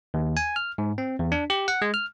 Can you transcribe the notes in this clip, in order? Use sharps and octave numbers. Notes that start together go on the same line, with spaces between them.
D#2
G#5
F6
G#2
C4
E2
D4
G4
F#5
G#3
F6